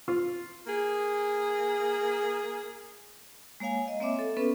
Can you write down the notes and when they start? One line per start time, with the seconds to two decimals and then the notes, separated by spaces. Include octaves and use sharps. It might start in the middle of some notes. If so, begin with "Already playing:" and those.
0.08 F4
0.67 A#3 G#4
3.60 G#3 A#3 C#5 F5 G#5
3.88 D#5
4.00 A#3 C4 C#5 E5 D6
4.19 A4
4.37 B3 C#4 A4 B4